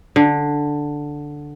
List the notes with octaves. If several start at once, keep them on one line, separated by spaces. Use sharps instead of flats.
D3